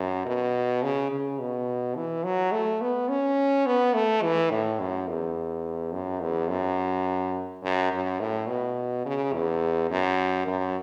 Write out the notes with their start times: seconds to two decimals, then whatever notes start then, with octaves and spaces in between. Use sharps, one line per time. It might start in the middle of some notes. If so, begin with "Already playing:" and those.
Already playing: F#2
0.26 B2
0.83 C#3
1.11 C#3
1.39 B2
1.96 E3
2.24 F#3
2.52 A3
2.82 B3
3.09 C#4
3.66 B3
3.94 A3
4.23 E3
4.51 A2
4.80 F#2
5.08 E2
5.93 F#2
6.21 E2
6.50 F#2
7.63 F#2
7.92 F#2
8.20 A2
8.48 B2
9.06 C#3
9.33 E2
9.91 F#2
10.47 F#2